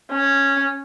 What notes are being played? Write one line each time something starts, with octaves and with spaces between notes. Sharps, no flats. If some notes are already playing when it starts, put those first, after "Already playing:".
C#4